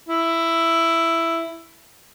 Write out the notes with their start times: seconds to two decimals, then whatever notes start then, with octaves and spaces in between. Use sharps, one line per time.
0.09 E4